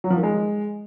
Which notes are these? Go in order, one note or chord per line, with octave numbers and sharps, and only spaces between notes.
F#3
F3
D#3
G#3